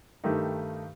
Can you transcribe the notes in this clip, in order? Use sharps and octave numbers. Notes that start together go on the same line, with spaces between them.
G2 D#3 A3 D#4 G4